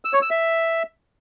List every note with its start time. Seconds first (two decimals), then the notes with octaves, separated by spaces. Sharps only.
0.05 E6
0.13 C#5
0.22 E6
0.31 E5